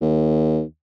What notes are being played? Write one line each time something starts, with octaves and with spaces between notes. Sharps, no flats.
D#2